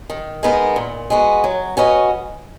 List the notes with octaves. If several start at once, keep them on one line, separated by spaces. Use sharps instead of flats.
D#3
G#3 B3 D#4 A#4
A#2
G#3 B3 F#4
F#3
C#4 F#4 B4 D#5